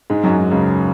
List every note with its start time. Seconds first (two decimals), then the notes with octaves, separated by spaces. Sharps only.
0.10 G#2 G#3
0.24 F#2 F#3
0.38 G#2
0.52 C#2 C#3